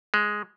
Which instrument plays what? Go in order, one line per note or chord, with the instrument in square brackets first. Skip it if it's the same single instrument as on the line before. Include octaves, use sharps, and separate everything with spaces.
[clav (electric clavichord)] G#3